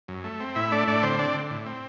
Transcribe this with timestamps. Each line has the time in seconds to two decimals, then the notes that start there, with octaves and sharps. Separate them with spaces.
0.08 F#2
0.24 A3
0.40 C4
0.55 A2 E4 E5
0.72 A3 D4 D5
0.87 A2 D4 D5
1.03 D3 C4 C5
1.19 C4 D4 D5
1.34 D3
1.51 A2
1.66 C4